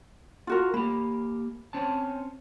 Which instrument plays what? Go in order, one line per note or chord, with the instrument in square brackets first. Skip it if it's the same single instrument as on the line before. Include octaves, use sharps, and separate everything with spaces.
[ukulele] F4 F#4 A#4
[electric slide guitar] A#3 G4 [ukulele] B5
[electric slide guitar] C4 C#4 A5